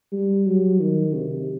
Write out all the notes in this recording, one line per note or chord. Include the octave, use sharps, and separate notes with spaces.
G3
F#3
D#3
C3